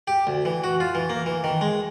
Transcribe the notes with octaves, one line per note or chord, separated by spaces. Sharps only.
G4
D2
E3
F#4
F4
E3
A#3
E3
D#3
G#3